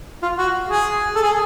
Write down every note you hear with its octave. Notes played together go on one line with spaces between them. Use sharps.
F4
F#4
G#4
A4
G#4